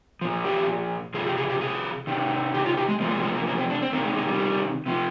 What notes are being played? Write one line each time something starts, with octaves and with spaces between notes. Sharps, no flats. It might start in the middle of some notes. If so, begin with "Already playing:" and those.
A#2 F3
G4
C3 F3 G#4
G4
G#4
G4
G#4
C3 D#3
G4
F4
G4
G#3
C3 F3 A#3
G#3
G#3
A#3
A#3
C4
D4
C4
C3 D#3 A#3
G#3
G#3
G3
C3 F3